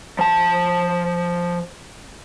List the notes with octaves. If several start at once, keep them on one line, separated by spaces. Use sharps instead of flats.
F3 A5